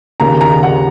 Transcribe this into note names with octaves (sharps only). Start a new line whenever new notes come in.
D#2 C#3 A#3 A#5
A#5
F#5